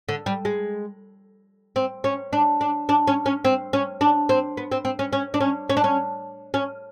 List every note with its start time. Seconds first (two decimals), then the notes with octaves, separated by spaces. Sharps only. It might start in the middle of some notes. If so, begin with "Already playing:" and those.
0.09 D3
0.26 G3
0.45 G#3
1.76 C4
2.04 C#4
2.33 D4
2.61 D4
2.89 D4
3.07 C#4
3.26 C#4
3.45 C4
3.73 C#4
4.01 D4
4.29 C4
4.57 B3
4.72 C4
4.85 C4
4.99 C#4
5.13 C#4
5.34 D4
5.40 C#4
5.70 C#4
5.77 D4
5.84 C#4
6.54 C#4